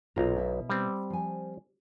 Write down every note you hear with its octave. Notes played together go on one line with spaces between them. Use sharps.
B1 A#2 B3 F4 A#5
B2 E4 E5
G3 C4
F3 G#5